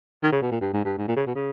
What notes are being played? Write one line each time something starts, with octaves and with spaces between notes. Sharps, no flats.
D#3
C#3
B2
A#2
G2
G#2
G2
G#2
A#2
C#3
B2
C#3